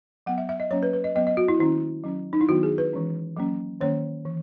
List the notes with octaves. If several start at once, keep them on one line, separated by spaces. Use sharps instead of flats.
F#3 B3 F#5
E5
E5
D#5
F#3 A#3 C#4 C#5
B4
B4
D#5
F#3 B3 D#5
D#5
F#4
E4
D#3 A#3 C#4 E4
F#3 C#4
D#4
E4
D#3 F#3 B3 F#4
G#4
B4
E3 G#3 C#4
F#3 A#3 C#4
D#3 A#3 C#4 C#5
E3